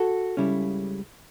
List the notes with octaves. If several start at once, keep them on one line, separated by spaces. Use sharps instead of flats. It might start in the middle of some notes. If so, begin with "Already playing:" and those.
Already playing: F#4 A4
C#2 C#3 G3 C#4 E4